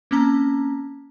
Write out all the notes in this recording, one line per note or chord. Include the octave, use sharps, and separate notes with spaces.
A#3 C4 C#4 A5 A#5